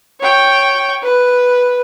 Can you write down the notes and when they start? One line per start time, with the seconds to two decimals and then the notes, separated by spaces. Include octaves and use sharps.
0.21 C#5 G5
1.03 B4